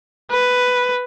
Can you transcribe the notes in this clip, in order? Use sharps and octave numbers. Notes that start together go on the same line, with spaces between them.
B4